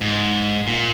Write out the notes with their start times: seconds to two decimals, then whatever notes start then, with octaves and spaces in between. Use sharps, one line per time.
0.01 G#2
0.67 A#2